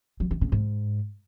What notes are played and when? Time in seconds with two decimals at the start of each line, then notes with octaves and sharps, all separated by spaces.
0.20 F#3
0.31 D#3
0.41 C#3
0.52 G#2